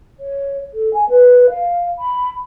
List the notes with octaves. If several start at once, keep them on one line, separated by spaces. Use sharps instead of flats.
C#5
A4
G#5
B4
F5
B5